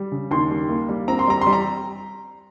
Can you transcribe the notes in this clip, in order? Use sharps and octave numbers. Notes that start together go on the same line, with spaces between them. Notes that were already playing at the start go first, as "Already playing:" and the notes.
Already playing: G3
C#3
D#2 C6
G3
A#3
G3
C4 A#5
C6
G3 A#5
G3 C6
A#5